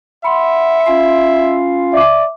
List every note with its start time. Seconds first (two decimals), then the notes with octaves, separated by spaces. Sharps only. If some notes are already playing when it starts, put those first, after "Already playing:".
0.24 E5 F#5 B5 C6
0.87 C#4 F4 F5
1.93 D5 E5 D6